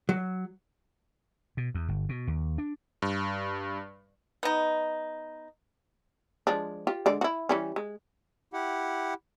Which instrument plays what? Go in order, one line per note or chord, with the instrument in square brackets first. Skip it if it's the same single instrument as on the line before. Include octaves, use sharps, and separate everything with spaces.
[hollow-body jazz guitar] F#3
[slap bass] B2
E2
G1
B2
D#2
D4
[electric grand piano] G2
[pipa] B3 D#4
[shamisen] F3 G#3 D4
F4 G4
D3 G#3 D5
E4 F#4
E3 G3 C#4
G#3
[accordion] E4 G4 F#5